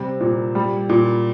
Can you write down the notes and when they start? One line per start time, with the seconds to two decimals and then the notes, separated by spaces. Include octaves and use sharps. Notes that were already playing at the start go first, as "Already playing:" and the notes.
Already playing: C3 G3 C4
0.20 A#2
0.55 G3
0.89 A#2